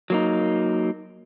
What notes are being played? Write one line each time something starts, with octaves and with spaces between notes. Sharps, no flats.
F#3 A#3 D#4